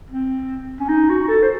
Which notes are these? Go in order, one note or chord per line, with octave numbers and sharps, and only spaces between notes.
C4
C#4
D#4
F#4
A4
C5